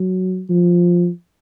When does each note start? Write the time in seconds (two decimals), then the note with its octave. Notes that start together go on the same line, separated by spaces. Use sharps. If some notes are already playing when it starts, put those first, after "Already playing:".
Already playing: F#3
0.50 F3